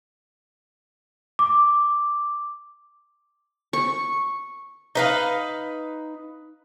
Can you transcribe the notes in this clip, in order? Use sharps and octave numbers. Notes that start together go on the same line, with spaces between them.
D6
C#6
D#4 B4 F5